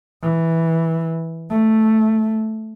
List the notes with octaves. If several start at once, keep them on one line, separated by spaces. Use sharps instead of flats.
E3
A3